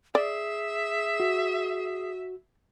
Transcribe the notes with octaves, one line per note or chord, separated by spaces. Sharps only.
G#4 D5 E5
F#4